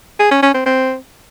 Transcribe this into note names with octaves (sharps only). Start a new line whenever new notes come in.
G#4
C#4
C#4
C4
C4